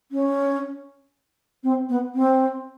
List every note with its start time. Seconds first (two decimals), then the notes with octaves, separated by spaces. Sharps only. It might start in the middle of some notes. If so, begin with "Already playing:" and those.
0.12 C#4
1.63 C4
1.89 B3
2.15 C4